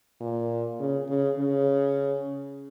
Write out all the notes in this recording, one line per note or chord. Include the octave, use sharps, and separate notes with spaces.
A#2
C#3
C#3
C#3